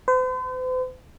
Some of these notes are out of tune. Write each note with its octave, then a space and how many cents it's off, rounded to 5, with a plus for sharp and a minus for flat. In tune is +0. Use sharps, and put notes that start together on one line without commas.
C5 -45